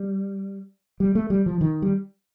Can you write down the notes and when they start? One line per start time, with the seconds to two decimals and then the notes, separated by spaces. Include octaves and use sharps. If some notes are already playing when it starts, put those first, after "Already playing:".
Already playing: G3
1.00 G3
1.15 A3
1.30 G3
1.46 F3
1.61 D#3
1.82 G3